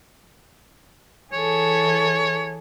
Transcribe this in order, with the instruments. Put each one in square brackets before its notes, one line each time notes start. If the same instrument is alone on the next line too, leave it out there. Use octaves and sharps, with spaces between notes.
[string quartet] E3 G#4 A4 [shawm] C#5